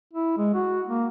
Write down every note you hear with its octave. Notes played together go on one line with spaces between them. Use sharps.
E4
G#3
F#4
A#3